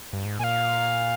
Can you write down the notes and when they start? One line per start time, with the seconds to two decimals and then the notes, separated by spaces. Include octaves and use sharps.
0.13 G2
0.25 G#2
0.39 A#2 F5 G#5